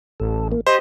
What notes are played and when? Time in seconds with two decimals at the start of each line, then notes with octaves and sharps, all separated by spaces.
0.20 A1 A4
0.52 A#3
0.67 G4 C5 D#5 B5